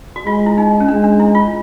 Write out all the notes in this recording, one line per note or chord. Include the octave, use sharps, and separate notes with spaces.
F#4
G#3 F4
E4
D#4
C#4
G#3 D4
D4
E4
F4